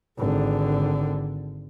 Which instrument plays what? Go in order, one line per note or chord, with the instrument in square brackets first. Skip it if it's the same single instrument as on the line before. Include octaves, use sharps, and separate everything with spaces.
[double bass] G#1 D3